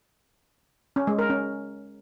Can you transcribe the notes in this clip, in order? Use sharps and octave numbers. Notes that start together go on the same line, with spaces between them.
C#4
G#3
A#4
C#4